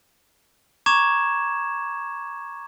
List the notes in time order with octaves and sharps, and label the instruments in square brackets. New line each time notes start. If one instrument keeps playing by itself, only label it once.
[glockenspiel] A#5 C#6 D6 G#6 E7